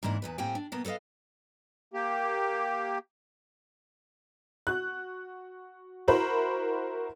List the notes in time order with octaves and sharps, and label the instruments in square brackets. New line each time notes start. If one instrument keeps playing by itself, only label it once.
[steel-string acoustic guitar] G#2 E3 A#3 D4 E4
E2 A#2 B4
A2 A#3 C4 G4 G5 G#5
D4
B2 A#3 B3
A4 B4 C5 D#5 F5
[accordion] A#3 G4
[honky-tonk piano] F#4 F#6
E4 F#4 A#4 C5 B5